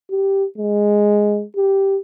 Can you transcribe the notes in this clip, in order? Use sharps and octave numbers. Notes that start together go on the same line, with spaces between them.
G4
G#3
G4